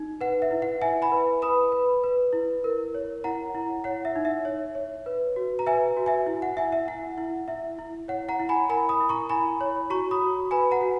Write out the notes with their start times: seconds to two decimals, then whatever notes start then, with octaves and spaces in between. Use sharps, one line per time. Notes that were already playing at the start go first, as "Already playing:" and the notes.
Already playing: D#4
0.21 B4 F#5
0.42 E5
0.51 E4
0.62 F#5
0.82 E4 E5 G#5
1.02 G#5 B5
1.12 B4
1.42 B4 B5 D#6
1.72 B4
2.04 B4
2.33 E4
2.64 A#4
2.94 C#5
3.24 E4 F#5 A#5
3.55 E4
3.84 C#5 F#5
4.05 E5
4.16 D#4
4.25 E5
4.45 C#5
4.75 C#5
5.06 B4
5.36 F#4
5.59 A#5
5.66 B4 E5 G#5
5.97 F#4
6.06 E5 G#5
6.27 E4
6.42 F#5
6.57 E4 E5 G#5
6.72 E5
6.88 E4 F#5
7.18 E4
7.48 E4 E5
7.79 E4
8.08 C#5 F#5
8.29 F#5 A#5
8.40 E4
8.49 G#5 B5
8.69 A#4 G#5 B5
8.89 B5 D#6
9.00 E4
9.09 A#5 C#6
9.29 E4 G#5 B5
9.61 C#5
9.90 F#4 A#5 C#6
10.11 B5 D#6
10.21 F#4
10.51 B4 G#5 B5
10.71 F#5 A#5
10.81 F#4